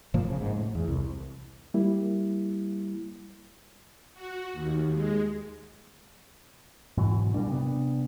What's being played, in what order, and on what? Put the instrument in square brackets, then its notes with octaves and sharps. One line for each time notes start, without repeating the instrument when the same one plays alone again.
[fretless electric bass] G1 A#2 F3 A#3
C#3
G#2
A2
E2
C2
[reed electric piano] G3 A#3 E4
[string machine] F#4
D#2
G#3
[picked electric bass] G#2 B2 E3 F#3
A#2 G3 A#3 D4
C3 B3 D4